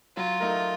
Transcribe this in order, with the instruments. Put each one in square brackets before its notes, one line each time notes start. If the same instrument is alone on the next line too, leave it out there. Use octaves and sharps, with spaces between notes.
[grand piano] F#3 [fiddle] F4
[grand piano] A3 D#4 A#4